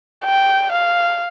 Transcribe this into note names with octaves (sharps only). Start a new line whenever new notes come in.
G5
F5